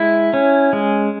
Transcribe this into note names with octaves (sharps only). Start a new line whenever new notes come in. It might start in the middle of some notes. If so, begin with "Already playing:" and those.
Already playing: G#3 E4
C#4
G#3